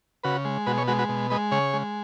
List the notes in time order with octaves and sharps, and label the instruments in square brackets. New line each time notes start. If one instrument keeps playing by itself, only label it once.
[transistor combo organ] C#3 F#4 B4
G#3
B2 F#4 B4
G#4 C#5
G#3 F#4 B4
F#4 B4
B2
G#3 B4 D#5
C#3 G#4 C#5
G#3